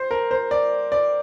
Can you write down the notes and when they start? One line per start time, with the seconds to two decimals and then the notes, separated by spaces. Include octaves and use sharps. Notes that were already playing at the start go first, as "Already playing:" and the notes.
Already playing: C5
0.11 A#4
0.31 C5
0.51 D5
0.92 D5